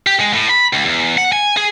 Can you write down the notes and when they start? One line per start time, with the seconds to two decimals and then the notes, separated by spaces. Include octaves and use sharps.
0.07 G4
0.20 G#3
0.34 A2
0.49 B5
0.73 C#2
0.85 E2
1.18 F#5
1.32 G#5
1.57 G#4